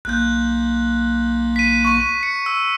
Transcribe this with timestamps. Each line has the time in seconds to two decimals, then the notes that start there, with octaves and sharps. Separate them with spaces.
0.05 B1 A#3 F#6 G6
1.56 B6 D#7
1.85 C#6 D#7
2.23 C#7
2.46 E6